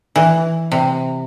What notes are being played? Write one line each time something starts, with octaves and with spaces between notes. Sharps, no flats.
E3
C3